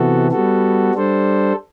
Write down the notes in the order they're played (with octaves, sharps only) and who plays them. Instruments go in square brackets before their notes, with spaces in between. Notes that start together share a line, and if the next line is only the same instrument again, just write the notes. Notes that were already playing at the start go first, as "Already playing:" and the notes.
Already playing: [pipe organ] C3 E3 B3 F#4 A4
G3 B3 F#4 A4
G3 D4 A4 C5